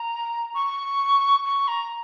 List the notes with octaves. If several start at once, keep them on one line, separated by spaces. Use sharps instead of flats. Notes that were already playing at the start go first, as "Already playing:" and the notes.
Already playing: A#5
C#6
C#6
A#5